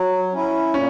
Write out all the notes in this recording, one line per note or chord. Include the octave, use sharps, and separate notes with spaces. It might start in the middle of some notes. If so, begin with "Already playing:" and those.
Already playing: F#3
C#4 E4
A#2 C#4